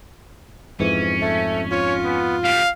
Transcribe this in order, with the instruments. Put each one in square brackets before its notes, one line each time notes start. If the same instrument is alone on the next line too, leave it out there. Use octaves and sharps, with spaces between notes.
[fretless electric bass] F2 G#2 [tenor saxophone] E3 [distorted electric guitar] C#4
[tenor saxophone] A3
[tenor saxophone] F4 [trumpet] C#5
[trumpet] B3
[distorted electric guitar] B2 G3 [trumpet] F5